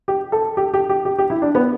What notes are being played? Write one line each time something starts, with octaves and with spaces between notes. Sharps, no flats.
G4
A4
G4
G4
G4
G4
G4
E4
D4
B3